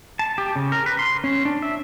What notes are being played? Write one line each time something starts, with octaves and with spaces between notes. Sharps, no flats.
A5
G4
C#3
A#4
B4
C6
C#4
D4
E5